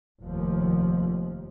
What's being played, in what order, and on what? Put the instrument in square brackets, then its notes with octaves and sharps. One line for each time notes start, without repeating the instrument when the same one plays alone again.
[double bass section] F1 D#2 F3